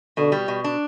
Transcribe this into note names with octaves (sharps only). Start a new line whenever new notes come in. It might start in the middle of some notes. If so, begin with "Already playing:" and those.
B2 D3
G3
B2
D4